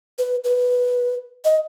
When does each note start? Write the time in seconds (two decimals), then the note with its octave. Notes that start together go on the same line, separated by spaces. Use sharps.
0.18 B4
0.44 B4
1.45 D#5